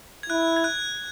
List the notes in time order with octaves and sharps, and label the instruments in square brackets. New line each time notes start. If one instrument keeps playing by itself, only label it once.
[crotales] G#6
[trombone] E4 [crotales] F#6
[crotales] G#6
F#6